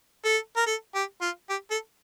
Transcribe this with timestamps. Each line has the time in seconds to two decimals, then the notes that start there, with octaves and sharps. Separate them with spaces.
0.25 A4
0.56 A#4
0.66 A4
0.95 G4
1.21 F4
1.50 G4
1.71 A4